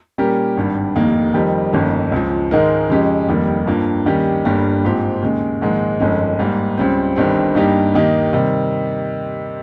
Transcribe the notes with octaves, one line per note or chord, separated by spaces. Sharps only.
A#2 G3 C#4 G4 A#4
G#1 G2 G3
F1 D#2 D#3 A#3
F2 D#3 G3 C4 G4
G1 F2 D#3 A#3 C#4
C#2 C#3 F3
G#2 D#3 G#3 D#4 A#4
F2 C#3 G#3 C#4 G4
F1 D#2 D#3 G3
G2 F3 A#3
D#2 D#3 G3 C#4 G4
G1 G2 G3 A#3
A#1 G#2 F3 C4 G4
D#2 C#3 G#3
A#1 G#2 D#3 G#3
G1 F2 D#3 G#3 C#4
G#2 G3 A#3
C#2 C#3 G3 C4
G1 G2 D#3 G3 C4
G2 G3 A#3 D#4 G4
D#2 D#3 A#3 D#4 G4
C3 D#3 G3